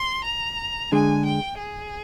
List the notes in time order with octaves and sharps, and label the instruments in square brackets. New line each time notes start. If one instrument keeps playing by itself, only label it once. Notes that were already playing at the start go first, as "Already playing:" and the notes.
Already playing: [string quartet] C6
A#5
[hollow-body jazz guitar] D3 G#3 D4 G#4 [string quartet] G#5
[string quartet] G5
G#4